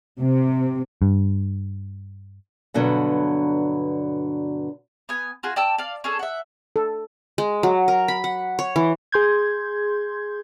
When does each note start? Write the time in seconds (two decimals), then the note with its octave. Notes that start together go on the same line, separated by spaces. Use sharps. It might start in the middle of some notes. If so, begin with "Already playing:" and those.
0.20 C3
1.02 G2
2.74 G2 B2 D3 F#3
5.09 B3 G#5
5.43 F4 F#4 G#4
5.56 D5 G5 A5 E6
5.78 D5 F5
6.04 C#4 G#4 A4
6.19 E5 F#5
6.76 A4
7.38 G#3
7.63 F#3
7.88 A#4
8.08 B5
8.24 F#5
8.59 C#5
8.76 E3
9.12 G#4 C6 G6 G#6